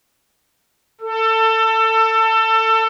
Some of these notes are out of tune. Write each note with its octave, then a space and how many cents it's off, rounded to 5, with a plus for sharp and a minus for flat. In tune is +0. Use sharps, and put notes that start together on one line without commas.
A4 +20